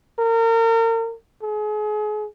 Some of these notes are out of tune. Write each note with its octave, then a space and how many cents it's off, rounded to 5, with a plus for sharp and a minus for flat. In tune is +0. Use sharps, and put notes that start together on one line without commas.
A#4 -35
G#4 +35